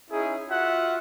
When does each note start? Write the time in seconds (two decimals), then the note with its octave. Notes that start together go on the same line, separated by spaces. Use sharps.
0.11 C#4 D#4 E4 G#4
0.50 F4 F#4 E5 F#5